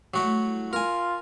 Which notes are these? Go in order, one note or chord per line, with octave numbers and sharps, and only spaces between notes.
F#3 G3 A3 E4 F#4
F4 A#4 G#5